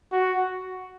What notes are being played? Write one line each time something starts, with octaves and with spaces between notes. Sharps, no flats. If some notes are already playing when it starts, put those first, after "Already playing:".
F#4